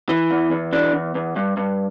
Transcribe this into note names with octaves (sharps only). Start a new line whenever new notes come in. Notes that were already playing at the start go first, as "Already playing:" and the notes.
E3
E2
E2
E3 D4
E2
E2
G2
G2